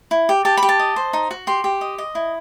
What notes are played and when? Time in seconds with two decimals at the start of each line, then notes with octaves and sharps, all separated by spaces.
0.11 E4
0.29 G4
0.45 G4 A5
0.57 B5
0.63 G4
0.69 A5
0.79 D#5
0.96 C5
1.13 D#4
1.31 F#4
1.47 G4 C6
1.64 G4
1.81 D#5
1.98 D#5
2.15 E4